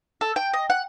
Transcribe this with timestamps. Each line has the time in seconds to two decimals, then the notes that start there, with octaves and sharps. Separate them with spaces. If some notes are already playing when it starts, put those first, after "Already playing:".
0.21 A4
0.36 G5
0.53 D#5
0.70 F#5